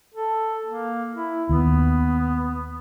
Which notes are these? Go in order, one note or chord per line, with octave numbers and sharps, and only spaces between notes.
A4
A#3
E4
D#2 B3